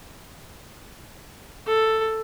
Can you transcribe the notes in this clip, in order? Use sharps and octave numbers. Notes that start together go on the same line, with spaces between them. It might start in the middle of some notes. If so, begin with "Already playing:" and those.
A4